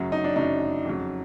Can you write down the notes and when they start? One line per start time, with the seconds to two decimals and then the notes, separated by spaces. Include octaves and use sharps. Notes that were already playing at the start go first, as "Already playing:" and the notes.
Already playing: F#2 C#3 F#3
0.12 D#4
0.24 D4
0.36 F#2 C#3 F#3 D#4
0.85 F2 C#3 F#3